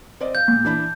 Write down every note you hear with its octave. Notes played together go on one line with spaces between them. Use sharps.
C4 D5 D#5
F5 G6
A#2
E3 D4 B5